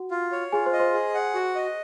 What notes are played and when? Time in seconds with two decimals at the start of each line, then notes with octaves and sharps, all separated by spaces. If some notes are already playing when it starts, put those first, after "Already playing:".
Already playing: F#4 F#5
0.11 F4
0.32 C#5
0.52 F4 G#4 G#5
0.66 C5 C6
0.73 D#5
0.79 C5 C6
0.94 G#4
1.14 F#5
1.34 F#4
1.55 D#5